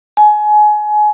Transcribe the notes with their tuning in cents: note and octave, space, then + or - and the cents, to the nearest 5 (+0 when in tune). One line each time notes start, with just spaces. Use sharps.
G#5 +25